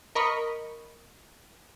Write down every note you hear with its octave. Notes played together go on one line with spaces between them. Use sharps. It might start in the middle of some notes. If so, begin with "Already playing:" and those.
A#4 D#5 B5 C#6